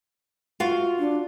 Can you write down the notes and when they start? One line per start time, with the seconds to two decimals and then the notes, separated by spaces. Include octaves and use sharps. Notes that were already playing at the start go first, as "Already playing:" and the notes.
0.60 F4 F#4 F5
0.99 D4